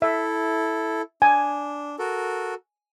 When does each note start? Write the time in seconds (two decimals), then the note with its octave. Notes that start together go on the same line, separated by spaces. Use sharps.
0.02 E4 A4 E5
1.22 D4 G#5
1.99 F#4 A4 A#4